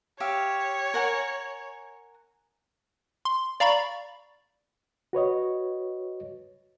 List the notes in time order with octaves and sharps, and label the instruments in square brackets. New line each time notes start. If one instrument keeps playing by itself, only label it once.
[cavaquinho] G4 E5 F5 [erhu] C#5
[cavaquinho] A#4 F#5 G#5
[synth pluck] C6
D5 F5 A#5 B5 C#6 A6
[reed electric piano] F#4 B4 C#5 D#5